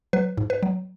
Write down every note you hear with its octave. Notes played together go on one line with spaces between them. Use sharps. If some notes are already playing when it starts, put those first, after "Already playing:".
F#3 B4
G#2
B4
F#3